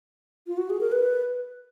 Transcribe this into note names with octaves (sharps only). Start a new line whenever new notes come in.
F4
F#4
G#4
A#4
B4